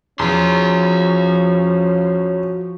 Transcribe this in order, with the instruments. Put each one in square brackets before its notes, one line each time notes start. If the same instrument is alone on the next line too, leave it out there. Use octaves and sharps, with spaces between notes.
[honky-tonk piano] E2 [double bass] F3 [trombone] C#4 [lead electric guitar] F#4 C6